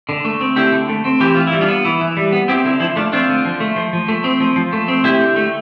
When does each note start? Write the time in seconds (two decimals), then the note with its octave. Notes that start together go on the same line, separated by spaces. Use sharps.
0.09 D3
0.25 A3
0.41 C4
0.56 D3 E4 G4
0.72 D3
0.89 A3
1.05 C4
1.20 E3 G4
1.35 E3 F4
1.47 E4
1.53 G3
1.61 D4 F4
1.68 B3
1.85 E3 E4
2.01 E3
2.17 G3
2.32 B3
2.48 C4 E4 G4
2.65 D3 E4
2.80 F3 E4
2.96 A3 D4 F4
3.13 C4 D4 F4
3.29 D3
3.45 F3
3.60 A3
3.76 F3
3.93 F3
4.08 A3
4.24 C4
4.40 F3
4.56 F3
4.73 A3
4.88 C4
5.04 D3 E4 G4
5.21 D3
5.36 A3